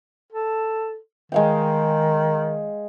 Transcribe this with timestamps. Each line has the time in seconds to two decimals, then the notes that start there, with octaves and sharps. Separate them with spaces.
0.33 A4
1.32 D#3 G#3 F5 G5